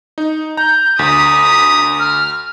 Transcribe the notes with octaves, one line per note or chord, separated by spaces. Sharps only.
D#4
A#5 G6
D2 A#5 D#6 B6
F6